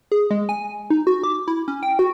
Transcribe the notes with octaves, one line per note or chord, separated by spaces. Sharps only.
G#4
G#3
G#5
D#4
F#4
D6
E4
C#4
G5
F#4